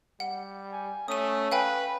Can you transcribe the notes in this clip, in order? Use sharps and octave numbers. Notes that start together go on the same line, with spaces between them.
G3 F#5
G#5
A3 C#4 D#6 D#7
B4 F5 G5 G#5